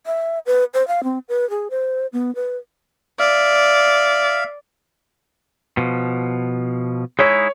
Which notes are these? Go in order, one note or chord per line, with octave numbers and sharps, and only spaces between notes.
E5
B4
C5
F5
C4
B4
G#4
C5
B3
B4
D5 E5 F5
B2 F3
G#3 D#4 E4 C#5